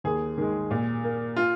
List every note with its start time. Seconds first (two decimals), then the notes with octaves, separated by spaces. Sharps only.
0.04 D#2 G#4
0.38 D#3 G#3
0.71 A#2
1.04 A#3
1.36 F4